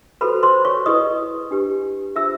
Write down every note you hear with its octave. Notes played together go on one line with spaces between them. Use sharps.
F#4 A4 B4 C5 B5
C5 C6
C#5 C#6
E4 G#4 B4 D#5 D#6
D4 G4 B4
D4 F4 G#4 C5 E5 E6